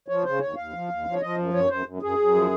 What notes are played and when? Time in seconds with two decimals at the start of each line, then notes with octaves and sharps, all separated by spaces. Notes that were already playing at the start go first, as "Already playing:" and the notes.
0.08 F3 C#5
0.24 C#3 C5
0.40 D#2 C#5
0.56 D#2 F5
0.73 F3
0.89 D#2
1.05 F3
1.13 C#5
1.21 F3 D#5
1.38 F#2
1.53 F#2 C#5
1.70 F#2 C5
1.86 F#2
2.02 F#2 G#4
2.18 F#2
2.35 F3